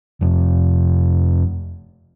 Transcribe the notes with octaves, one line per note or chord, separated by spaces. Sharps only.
F1 F2